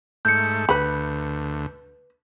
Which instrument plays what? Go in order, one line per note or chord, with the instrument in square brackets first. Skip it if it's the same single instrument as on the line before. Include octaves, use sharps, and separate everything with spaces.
[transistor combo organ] G#2 A3 [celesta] G6 C#7
[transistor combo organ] D2 [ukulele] B4 B5